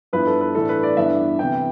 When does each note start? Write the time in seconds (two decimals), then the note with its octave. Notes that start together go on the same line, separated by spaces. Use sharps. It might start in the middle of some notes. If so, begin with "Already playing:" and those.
0.13 G2 F3 B3 E4 B4
0.27 A4
0.41 B4
0.55 A2 E3 A3 D4 A4
0.69 B4
0.83 D5
0.97 G2 E3 B3 D4 E5
1.39 C3 E3 B3 G5